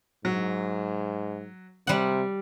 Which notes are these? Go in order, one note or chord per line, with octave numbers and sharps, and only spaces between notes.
G#2 F#3
C3 G3 F#5